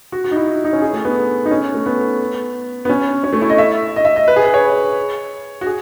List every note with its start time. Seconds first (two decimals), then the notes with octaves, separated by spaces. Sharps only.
0.12 F#4
0.24 F#4
0.31 D#4
0.36 E4
0.47 F#4
0.64 D#4
0.73 C#4
0.82 G#4
0.93 A3
1.05 B3
1.45 D#4
1.51 C#4
1.74 A3
1.86 B3
2.85 B3
2.90 C#4
3.24 C#4
3.33 A3
3.41 E4
3.50 D#5
3.58 E5
3.96 D#5
4.05 E5
4.16 D#5
4.28 B4
4.36 G#4
4.45 B4
4.54 C#5
5.61 F#4
5.66 G#4